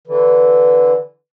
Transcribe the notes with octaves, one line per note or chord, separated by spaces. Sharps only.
D3 E3